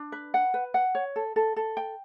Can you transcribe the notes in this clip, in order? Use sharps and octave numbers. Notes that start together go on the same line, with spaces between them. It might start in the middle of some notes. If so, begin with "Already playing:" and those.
Already playing: D4
B4
F#5
B4
F#5
C#5
A4
A4
A4
G5